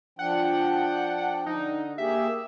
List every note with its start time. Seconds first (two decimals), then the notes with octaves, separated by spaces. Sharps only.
0.19 F3 D4 F#5 G5
1.46 D3 D#4
1.98 A#3 G4 G#4 E5